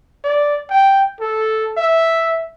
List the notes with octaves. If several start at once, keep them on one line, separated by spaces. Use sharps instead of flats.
D5
G5
A4
E5